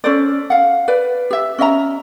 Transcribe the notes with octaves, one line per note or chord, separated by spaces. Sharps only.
C#4 A4 C5 D5
F5 F#5
B4 D5
G4 E5
C#4 D#5 E5 A#5